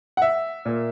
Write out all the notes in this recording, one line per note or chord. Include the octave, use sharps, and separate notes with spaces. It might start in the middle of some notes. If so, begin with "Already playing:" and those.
F#5
E5
A#2 A#3